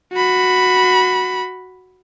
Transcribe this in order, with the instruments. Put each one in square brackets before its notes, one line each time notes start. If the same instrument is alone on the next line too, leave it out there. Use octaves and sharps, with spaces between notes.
[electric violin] F#4 B5